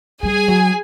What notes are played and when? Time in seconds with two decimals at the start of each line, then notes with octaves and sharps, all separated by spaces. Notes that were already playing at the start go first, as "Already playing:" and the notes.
0.22 G3 G#4 G#5
0.48 F#3